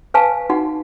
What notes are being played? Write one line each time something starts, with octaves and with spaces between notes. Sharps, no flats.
B4 F5 G#5 A5
D#4 F#4 F#5